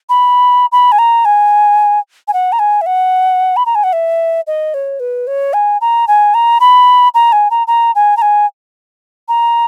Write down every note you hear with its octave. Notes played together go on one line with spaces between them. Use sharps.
B5
B5
G#5
A#5
G#5
G#5
F#5
A#5
G#5
E5
F#5
B5
A#5
G#5
F#5
E5
D#5
C#5
B4
C#5
G#5
A#5
G#5
A#5
B5
A#5
G#5
A#5
A#5
G#5
A#5
G#5
A#5